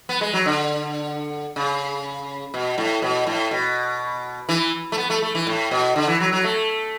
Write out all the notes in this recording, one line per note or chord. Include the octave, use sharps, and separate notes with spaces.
B3
G#3
F#3
D3
C#3
B2
A2
B2
A2
B2
E3
A3
B3
A3
A3
E3
A2
B2
D3
E3
F#3
F#3
A3